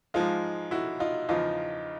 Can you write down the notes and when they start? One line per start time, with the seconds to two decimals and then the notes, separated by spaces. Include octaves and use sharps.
0.14 G#2 F3 G#3 D#4 F4
0.71 E4 F#4
1.00 D#4 F4
1.29 E2 C#3 F3 D#4 F4